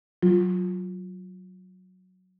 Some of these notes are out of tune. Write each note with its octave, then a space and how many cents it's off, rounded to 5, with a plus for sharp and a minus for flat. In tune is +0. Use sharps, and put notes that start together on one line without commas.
F#3 +0 F4 +15